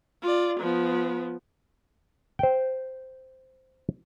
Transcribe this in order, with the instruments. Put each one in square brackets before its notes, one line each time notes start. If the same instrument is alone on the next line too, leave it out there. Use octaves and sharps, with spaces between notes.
[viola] F4 D5
F3 B3
[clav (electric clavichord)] C5 G5